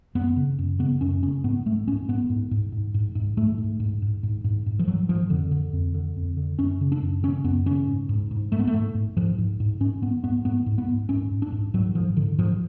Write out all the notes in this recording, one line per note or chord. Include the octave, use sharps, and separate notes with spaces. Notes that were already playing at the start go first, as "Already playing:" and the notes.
F#2 B3
C#3
F#2
C#3 B3
F#2 C#4
C#3 C#4
G#2 B3
G#2 A3
G#2 C#4
G#2 B3
G#2
G#2
G#2
G#2
G#2
G#2 A3
G#2
G#2
G#2
G#2
G#2
G#2
F3
G#2 F#3
G#2 F3
F2 D3
D3
F2
D3
F2
D3
F#2 C#4
C#3
D4
F#2
C#3 C#4
F#2 B3
C#3 C#4
G#2
G#2
G#2
G#2 A3
B3
A3
G#2
G#2
G#2 F3
G#2
G#2
G#2 C#4
G#2 B3
G#2 B3
G#2 B3
G#2
B3
G#2
G#2 C#4
G#2
D4
G#2
G#2 F#3
G#2 F3
G#2 D3
G#2 F3